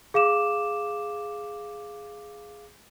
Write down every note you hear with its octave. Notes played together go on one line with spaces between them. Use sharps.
G#4 F5 D6 E7